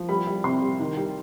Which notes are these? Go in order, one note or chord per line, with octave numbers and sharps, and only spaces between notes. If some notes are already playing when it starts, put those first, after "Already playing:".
Already playing: F3
G3 B5
G3
C3 C6
G3
D#3
G3